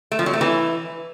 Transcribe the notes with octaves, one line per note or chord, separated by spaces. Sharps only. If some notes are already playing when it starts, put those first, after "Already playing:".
A3
F3
F#3
A3
E3